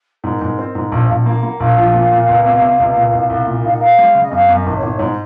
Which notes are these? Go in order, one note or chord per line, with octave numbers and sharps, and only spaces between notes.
G#2 A#4
G#2
C4
G#2
A#1 C5
F5
A#1 F#5
A#3
F#5
A#3
A#1 F5
F3
A#2
A#2
C#2
C3
C3
C#2
A#2
C2
C2
A#2
D#4 F5
F#5
A#4 F5
G#3
C#3
D#5
F#2 F5
F#2
D#5
G#1
C#5
G#1
G#2 C5